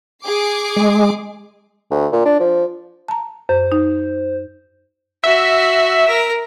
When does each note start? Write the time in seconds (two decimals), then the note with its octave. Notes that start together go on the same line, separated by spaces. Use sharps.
0.24 G#4 D6 C7
0.76 G#3
1.91 D2
2.12 A#2
2.25 D4
2.40 F3
3.08 A5 A#5
3.49 F#2 C5
3.72 D#4
5.24 F#4 E5
6.08 A#4